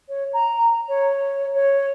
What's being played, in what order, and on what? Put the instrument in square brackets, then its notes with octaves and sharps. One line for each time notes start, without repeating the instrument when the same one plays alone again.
[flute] C#5
A#5
C#5
C#5